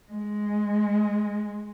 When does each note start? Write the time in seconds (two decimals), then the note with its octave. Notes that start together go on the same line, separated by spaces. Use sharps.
0.12 G#3